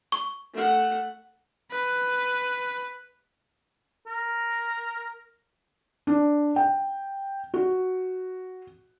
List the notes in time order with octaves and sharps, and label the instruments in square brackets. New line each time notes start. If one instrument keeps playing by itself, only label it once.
[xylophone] C#6
[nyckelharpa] A3 F#5
[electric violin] B4
[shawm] A#4
[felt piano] D4
G5
F#4